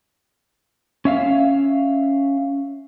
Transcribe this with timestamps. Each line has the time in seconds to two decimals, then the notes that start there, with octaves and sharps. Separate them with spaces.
1.05 C#4 E5 F5